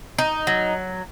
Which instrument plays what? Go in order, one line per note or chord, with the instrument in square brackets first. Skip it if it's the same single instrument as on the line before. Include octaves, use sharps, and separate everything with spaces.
[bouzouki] D#4
F#3